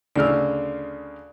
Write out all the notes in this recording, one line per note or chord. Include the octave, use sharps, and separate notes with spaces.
D2 C#3 D5 E6 F6